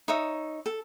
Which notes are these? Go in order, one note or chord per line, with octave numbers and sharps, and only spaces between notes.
D#4 C#5 E5 D#6
A4